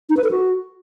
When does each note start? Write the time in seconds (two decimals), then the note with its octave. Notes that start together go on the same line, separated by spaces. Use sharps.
0.10 D#4
0.17 B4
0.24 A4
0.31 F#4